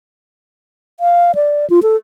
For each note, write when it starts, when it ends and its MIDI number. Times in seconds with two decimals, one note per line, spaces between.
1.00 1.35 77
1.35 1.68 74
1.70 1.80 65
1.83 1.96 69